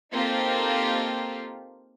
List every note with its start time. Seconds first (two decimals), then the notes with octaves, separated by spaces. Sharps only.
0.12 A#3 C4 D#4 F4 G4 A4